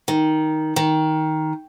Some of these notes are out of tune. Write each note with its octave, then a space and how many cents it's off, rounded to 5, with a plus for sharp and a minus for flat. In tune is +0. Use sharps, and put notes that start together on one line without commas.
D#3 +5
D#3 +10